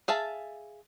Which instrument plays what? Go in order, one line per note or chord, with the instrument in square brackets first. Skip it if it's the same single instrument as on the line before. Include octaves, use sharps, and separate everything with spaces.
[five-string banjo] G#4 E5 F5 A5